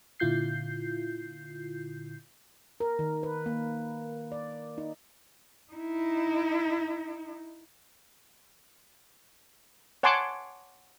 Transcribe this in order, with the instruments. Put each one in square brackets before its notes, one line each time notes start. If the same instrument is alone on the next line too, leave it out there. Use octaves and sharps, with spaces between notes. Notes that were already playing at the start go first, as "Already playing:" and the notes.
[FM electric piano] A#2 D3 E4 F4 G6 C7
[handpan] A#4
D#3
B4
A#3
D5
D#4
[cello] D#4 E4
[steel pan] C#5 F#5 G#5 A5 C6 D6